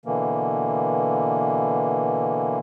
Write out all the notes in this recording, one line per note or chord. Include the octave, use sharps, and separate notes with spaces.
B2 D3 E3 A#3